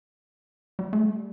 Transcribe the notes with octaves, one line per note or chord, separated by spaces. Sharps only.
G3
A3
G3